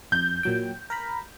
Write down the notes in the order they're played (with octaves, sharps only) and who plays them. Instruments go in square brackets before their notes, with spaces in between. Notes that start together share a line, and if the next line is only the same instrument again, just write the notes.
[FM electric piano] F2 [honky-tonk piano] G6
[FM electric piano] A#2 F#3 G5
A#4 A#5 B5